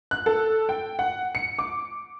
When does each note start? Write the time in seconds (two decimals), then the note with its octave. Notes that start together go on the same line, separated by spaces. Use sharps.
0.11 F#6
0.26 A4
0.69 G5
0.99 F#5
1.35 C#7
1.59 D6